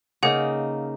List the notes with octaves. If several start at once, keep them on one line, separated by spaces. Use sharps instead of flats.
C#3 A#3 D#4 G#4 F#5